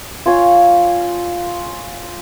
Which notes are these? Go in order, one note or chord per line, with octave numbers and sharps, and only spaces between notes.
F4 C#5 G#5